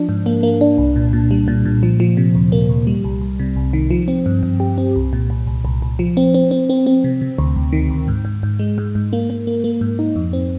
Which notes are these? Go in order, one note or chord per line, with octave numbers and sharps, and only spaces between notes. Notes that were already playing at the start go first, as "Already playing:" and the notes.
Already playing: F3 D4
G#2
A#3
A#3
D4
C2
A#2
A#2
G3
A#2
A#2
F3
F3
C3
D2
A#3
D2
G3
C2
C2
C3
C2
D#3
F3
C4
G2
G2
G4
C4
C2
A#2
C2
C2
C2
C2
F3
C4
C4
C4
C4
C4
C3
C3
D2
D2
D#3
D2
G#2
G#2
G#2
G#3
G#2
G#2
A#3
A#3
A#3
A#3
G#2
D#4
F2
C4